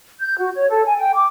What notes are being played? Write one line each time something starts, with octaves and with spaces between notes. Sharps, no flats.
G6
F#4
C#5
A4
G#5
G5
D6